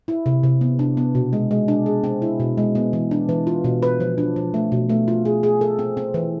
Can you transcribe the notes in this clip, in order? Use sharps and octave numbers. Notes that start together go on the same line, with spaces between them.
E4
C3
C3
B3
D4
B3
B2
G#3
G#3
D4
G#4
C4
E4
B2
G#3
B3
E3
D4
E3
F4
B2
B4
F3
D4
F3
A3
B2
A3
F4
G#4
G#4
A4
C4
C4
E3